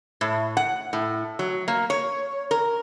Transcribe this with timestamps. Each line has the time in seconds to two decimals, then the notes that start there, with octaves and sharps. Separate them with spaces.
0.21 A2
0.57 F#5
0.93 A2
1.39 F#3
1.68 A#3
1.90 C#5
2.51 A#4